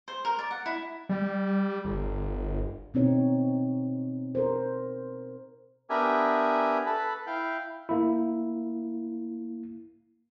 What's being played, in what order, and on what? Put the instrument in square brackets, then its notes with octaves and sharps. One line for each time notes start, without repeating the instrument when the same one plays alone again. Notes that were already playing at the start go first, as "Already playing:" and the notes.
[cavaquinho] C5
A#4
D5
F#5
E4
[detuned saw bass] G3
G1
[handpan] B2 C4 D#4 C#5
A#4 C5
[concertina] B3 D4 G4 A#4 E5 G#5
A4 B4 A5 B5
E4 F5 G5
[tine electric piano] A#3 E4